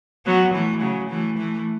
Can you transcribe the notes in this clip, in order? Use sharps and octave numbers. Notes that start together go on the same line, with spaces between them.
F#3 B3
E3 A3
C#3 F#3
E3 A3
E3 A3